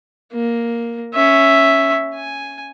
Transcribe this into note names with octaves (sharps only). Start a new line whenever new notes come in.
A#3
C#4 E5
G#5